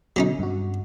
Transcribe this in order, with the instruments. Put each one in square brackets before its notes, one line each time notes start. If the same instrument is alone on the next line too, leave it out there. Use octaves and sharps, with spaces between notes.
[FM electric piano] B2 D3 [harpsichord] F#3 C#4 D#4
[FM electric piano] G2 F#4